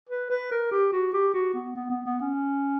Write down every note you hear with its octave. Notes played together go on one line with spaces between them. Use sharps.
B4
B4
A#4
G4
F#4
G4
F#4
B3
B3
B3
B3
C#4